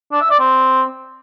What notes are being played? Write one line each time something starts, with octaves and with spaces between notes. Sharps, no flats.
D4
E5
D5
C4